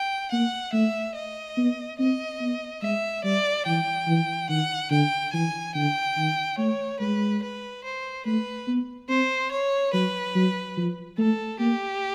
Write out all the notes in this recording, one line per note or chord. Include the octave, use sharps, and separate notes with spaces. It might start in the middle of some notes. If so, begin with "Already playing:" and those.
Already playing: G5
A#3 F#5
A3 E5
D#5
B3
C4 D#5
B3
G#3 E5
G3 D5
E3 G5
E3
D#3 F#5
D3 G5
E3 G#5
D3 G5
D#3
A3 C#5
G#3 B4
B4
C5
A3 B4
B3
C4 C5
C#5
F#3 B4
F#3
F3
A3 A4
A#3 G4